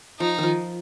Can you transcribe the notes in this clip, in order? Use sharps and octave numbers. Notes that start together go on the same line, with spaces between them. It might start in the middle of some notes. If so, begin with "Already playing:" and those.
F3 D#4
D#3 F3